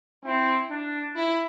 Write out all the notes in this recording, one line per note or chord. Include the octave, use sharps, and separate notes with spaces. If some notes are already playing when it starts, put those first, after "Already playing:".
C4 E4
D4
E4